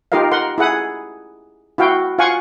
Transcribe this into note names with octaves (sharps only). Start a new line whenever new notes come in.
D#4 F4 G4 A#4 D#5 F5
A#4 F#5 C6
E4 G#4 F#5 D#6
E4 F#4 F5 G5
F4 F5 F#5 G#5 C#6